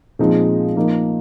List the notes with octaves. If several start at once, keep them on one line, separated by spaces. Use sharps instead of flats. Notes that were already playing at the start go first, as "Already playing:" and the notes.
A#2 F3 G#3 C4 D#4
F3 A#3 D#4